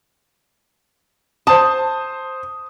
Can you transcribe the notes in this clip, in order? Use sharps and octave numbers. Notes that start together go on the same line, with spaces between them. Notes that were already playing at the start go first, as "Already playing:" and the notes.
C5 A5 D#6